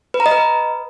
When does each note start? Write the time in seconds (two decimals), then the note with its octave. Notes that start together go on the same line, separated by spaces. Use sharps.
0.14 B4
0.20 A#5
0.26 D#5
0.31 B4